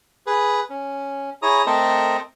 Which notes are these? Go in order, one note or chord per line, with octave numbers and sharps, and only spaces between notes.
G#4 B4
C#4
E4 G#4 C#5 A#5 D#6
A3 C4 A4 A#4 C5 D#5